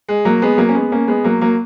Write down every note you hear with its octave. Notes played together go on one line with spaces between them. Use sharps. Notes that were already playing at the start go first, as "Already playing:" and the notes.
G#3
F#3 A#3
G#3 B3
F#3 A#3
C#4
G#3 B3
A#3 C#4
G#3 B3
F#3 A#3
F#3 A#3